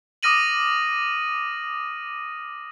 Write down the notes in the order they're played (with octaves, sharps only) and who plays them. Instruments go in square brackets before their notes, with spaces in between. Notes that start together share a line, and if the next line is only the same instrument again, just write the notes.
[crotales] D6 D#6 F6 A#6 D#7 F#7